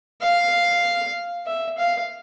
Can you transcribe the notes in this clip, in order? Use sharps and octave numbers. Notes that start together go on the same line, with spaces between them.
F5
E5
F5